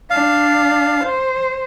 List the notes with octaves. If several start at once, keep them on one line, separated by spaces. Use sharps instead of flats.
D4 F5
C5